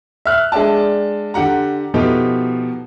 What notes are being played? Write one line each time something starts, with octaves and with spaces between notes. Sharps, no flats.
E5 F6 F#6
G#3 D4 D5 E5 G5 A5
D3 G4 F#5 A#5
B2 F3 A3 B3 D#4 G4